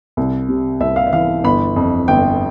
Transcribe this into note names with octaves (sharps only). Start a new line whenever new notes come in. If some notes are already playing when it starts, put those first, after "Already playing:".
C2
C3
C2 E5
F5
E5
E3 F5
G1 B5
F2
G1 G5